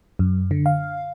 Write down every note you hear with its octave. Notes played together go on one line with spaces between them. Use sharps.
F#2
D3
F5